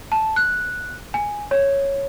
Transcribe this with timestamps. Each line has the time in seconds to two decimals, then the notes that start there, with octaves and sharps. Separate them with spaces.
0.12 A5
0.36 F#6
1.14 G#5
1.51 C#5